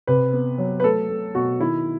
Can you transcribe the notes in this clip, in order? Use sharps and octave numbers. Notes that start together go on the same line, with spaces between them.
C3 B4
B3
F#3
B4
A3 A4
A3
B2 F#4
D#3 E4